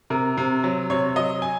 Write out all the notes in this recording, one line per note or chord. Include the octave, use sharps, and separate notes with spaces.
C3 A#4
C3
F#3
C3 C#5
F#3 D#5
G#5